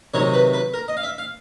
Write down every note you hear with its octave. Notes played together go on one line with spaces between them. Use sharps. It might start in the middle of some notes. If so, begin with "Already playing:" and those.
C3 D#3 F#3 C#5
B4
B4
A#4
D#5
F5
E5
F5